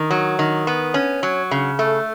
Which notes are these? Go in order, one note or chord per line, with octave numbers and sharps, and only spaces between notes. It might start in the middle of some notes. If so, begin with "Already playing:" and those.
Already playing: D#3
F#3
D#3
B3
C#4
F#3
C#3
A3